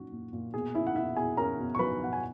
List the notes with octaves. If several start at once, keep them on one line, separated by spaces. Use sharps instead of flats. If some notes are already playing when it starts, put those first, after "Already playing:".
Already playing: A#2 F#3 C#4 D#4 F#4
A#2
A#2
B2 G#4
C#4 E4 E5
F#5
B2 E4 E5
B2 G#4 G#5
C#4 A#4 A#5
B2
C#6
F#3 B4 B5
B2 F#5
G#5